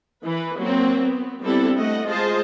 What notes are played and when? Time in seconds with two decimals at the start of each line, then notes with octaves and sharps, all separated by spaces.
0.23 E3 B4
0.57 F#3 A#3 C4
1.06 B3
1.42 G3 B3 C4 D4 E4 A4
1.76 A3 D#5 F#5
2.06 G#3 F4 G#4 C5 D#5 A5